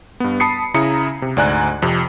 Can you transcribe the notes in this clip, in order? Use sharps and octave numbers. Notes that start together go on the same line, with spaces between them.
G2 B3
A5 B5 D#6 C7 C#7
C#3 E4 A#5 D#6 C#7
C3
D2 G#2 D5 G#5 A#5 F#6
F2 C3